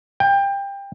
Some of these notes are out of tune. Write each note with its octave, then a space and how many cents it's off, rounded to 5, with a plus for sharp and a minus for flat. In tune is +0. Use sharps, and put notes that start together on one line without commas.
G5 +25